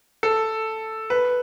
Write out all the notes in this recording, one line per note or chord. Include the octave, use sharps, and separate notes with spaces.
A4
B4